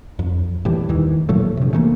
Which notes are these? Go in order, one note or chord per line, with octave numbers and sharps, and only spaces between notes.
F2
A2 E3 G3
D#2 D#3 E3
A#2 F3 F#3 A3
G2 C3
E3 A3 A#3